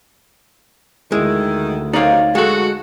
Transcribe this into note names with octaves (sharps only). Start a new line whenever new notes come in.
D2 D#3 G#3 E4
F#2 C3 D#3 D#4 C#5 D5 F5
G#3 F#4 A4